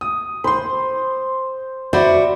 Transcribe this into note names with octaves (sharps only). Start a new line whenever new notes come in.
D#6
C5 B5 C6
F#4 C5 D5 E5 B5